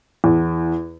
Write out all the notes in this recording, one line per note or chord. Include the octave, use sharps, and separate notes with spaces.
E2